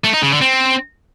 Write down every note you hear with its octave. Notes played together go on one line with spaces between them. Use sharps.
A3
D#4
C#3
D3
C4